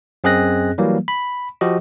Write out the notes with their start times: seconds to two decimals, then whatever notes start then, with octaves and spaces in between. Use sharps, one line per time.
0.24 F#2 C4 G#4 D#5 F#6 A#6
0.78 E3 F#3 G3 A#3
1.08 B5
1.61 F3 F#4 G4 D#5